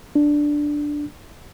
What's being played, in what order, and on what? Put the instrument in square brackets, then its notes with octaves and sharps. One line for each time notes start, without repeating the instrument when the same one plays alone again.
[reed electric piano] D4